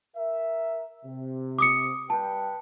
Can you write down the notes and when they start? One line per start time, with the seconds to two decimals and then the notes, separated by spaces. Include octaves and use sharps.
0.16 A#4 E5
1.04 C3
1.58 D6 D#6 C#7
2.10 G3 B4 G5 A5